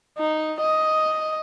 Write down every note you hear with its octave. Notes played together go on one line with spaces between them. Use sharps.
D#4
D#5